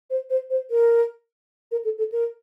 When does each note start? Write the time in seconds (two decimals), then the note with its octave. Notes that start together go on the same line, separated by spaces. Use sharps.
0.10 C5
0.30 C5
0.50 C5
0.71 A#4
1.72 A#4
1.85 A4
1.98 A4
2.12 A#4